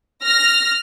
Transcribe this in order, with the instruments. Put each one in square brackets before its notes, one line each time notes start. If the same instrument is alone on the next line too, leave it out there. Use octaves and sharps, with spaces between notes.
[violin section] F6 A#6